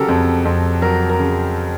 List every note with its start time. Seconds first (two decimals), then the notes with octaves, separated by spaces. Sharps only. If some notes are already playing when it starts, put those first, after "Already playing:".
Already playing: C#3 F#3 G4 A4 A#4
0.08 F2
0.45 F2
0.82 F#3 A#4
1.09 A#4
1.19 C#3